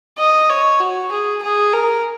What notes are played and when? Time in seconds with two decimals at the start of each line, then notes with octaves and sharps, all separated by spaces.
0.18 D#5
0.49 C#5
0.80 F#4
1.12 G#4
1.42 G#4
1.73 A#4